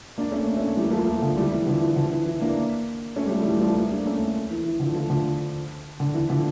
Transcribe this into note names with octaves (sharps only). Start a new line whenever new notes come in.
A#3 D4
A3 C#4
A#3 D4
A3 C#4
E3 G3
A#3
F3 A3
F3 A3
D3 F3
E3 G3
E3 G3
D3 F3
E3
D3 F3
E3
E3
A#3 D4
A3 C#4
G3
F3 A3
A3
E3 G3
G3
F3 A3
G3 A#3
A#3 D4
A3 C#4
E3
E3
D3 F3
F3 A3
D3 F3
D3
E3
D3 F3